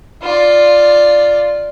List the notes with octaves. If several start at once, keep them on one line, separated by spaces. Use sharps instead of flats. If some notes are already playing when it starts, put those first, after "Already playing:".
F4 D5